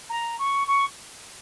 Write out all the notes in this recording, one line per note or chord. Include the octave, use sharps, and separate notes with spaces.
A#5
C#6
C#6